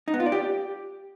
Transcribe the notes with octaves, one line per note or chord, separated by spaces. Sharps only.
D#4
B3
F4
D5
G4